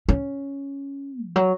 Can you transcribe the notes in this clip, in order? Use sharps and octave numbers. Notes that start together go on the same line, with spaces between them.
C#4
E3
F#3